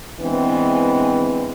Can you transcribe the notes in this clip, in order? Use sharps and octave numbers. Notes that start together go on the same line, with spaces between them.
E3 G#3 B3 C4 D4 B4